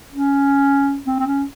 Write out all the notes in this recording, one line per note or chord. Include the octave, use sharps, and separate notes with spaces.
C#4
C4
C4
C#4